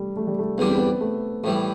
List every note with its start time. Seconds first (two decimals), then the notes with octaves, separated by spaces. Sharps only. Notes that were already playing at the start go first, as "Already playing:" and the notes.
Already playing: G3 A3
0.17 A3
0.27 G3
0.39 A3
0.58 E2 D3 G3 B3 D4
0.68 C4
0.78 B3
1.01 A3
1.43 A2 E3 G3 A3